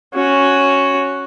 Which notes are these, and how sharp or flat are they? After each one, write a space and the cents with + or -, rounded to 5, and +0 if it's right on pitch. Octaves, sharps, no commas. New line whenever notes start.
C#4 +0 F#4 +0